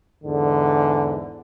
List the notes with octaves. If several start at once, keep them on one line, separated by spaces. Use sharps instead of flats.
E2 G#2 D3